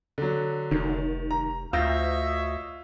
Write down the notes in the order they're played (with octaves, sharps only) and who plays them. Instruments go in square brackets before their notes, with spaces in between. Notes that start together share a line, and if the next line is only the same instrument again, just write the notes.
[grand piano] D3 F#3
[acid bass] F1 [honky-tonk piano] D#3
[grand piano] A#5
[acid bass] D2 [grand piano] F4 [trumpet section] C#5 D#5 E5 [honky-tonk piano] E6 G6 A#6